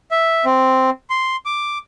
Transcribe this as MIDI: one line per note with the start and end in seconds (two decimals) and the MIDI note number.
0.11 0.45 76
0.45 0.90 60
1.10 1.36 84
1.46 1.78 86